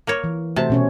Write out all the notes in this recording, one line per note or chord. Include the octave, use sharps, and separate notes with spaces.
A#3 A#4 C#5
E3
C3 A3 F#4 C5 A5
B2 C#4 C#5